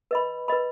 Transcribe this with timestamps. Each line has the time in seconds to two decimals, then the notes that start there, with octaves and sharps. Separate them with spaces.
0.11 B4 D#5 B5
0.48 B4 D#5 B5